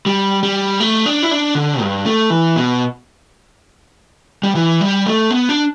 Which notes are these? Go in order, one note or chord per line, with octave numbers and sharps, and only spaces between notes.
G3
G3
A3
D4
E4
D4
D3
G2
A3
E3
B2
G3
E3
G3
A3
B3
D4